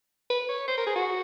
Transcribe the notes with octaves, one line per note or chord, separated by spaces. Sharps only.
B4
C#5
C5
A#4
G#4
F#4